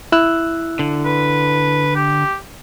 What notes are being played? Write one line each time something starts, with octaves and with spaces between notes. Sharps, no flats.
E4 E6 F#6
D3
B4
G4